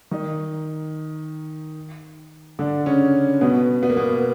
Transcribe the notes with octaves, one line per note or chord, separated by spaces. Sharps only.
D#3 D#4
D3 D4
C#3 C#4
B2 B3
B3
A#3
B2 B3